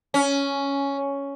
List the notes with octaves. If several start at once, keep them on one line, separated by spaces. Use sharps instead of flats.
C#4